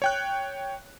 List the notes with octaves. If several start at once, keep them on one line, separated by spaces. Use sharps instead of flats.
C#5 G5 F#6